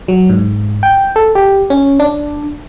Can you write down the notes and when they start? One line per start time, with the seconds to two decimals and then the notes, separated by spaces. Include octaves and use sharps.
0.08 F#3
0.29 G#2
0.83 G5
1.16 A4
1.35 G4
1.70 C#4
2.00 D4